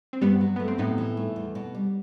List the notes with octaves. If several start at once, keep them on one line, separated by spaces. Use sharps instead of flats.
C4
G2 G3 B3
F#3
A3 B3
C4
A2 B3 D#4
E3
A3
E2
B2
G3